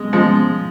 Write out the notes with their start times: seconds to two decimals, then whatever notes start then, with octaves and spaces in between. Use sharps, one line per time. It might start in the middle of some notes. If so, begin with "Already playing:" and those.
Already playing: G#3
0.13 F3 G#3